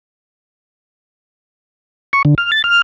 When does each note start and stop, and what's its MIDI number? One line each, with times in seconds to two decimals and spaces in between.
2.13 2.22 85
2.25 2.35 50
2.38 2.51 89
2.52 2.62 93
2.64 2.82 89